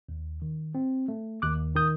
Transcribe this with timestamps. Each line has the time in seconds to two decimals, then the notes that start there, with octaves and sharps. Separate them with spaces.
0.09 D#2
0.42 D#3
0.75 C4
1.08 A3
1.42 D#2 D6 F#6
1.75 D#3 D#6 G6